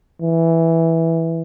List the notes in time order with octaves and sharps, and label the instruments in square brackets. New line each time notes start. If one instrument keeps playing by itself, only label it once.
[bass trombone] E3